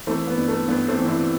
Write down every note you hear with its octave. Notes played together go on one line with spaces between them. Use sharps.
E3 A3 C4
B3
G2
A3
G2 B3
A3 C4
E3
C4 E4